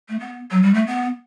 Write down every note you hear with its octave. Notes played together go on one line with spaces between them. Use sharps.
A3
B3
F#3
G3
A3
B3